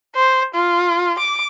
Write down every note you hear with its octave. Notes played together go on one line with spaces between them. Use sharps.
C5
F4
D6